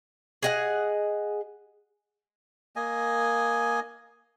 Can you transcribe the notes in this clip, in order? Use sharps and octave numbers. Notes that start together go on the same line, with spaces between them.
G#4 D#5 F#5
A#3 D#5 G#5